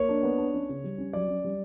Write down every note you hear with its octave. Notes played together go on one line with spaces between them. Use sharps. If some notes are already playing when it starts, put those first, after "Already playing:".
Already playing: A#3 C#5
D4
B3
D4
C#4
C#3
G3
C#4
F#3 D5
C#4
G3